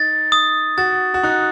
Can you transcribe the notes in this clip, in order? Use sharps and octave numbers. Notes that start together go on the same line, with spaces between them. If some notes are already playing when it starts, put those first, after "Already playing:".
Already playing: D#4 A6
D#6
F#4 A6
F#4
D#4 F#6